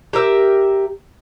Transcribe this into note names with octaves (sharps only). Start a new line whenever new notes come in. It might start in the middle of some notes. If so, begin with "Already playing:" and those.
G4 A#4 E5